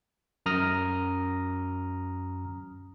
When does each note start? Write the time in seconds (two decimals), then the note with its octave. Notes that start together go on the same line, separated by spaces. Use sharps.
0.46 F#2 A#5 D#6 F6 A#6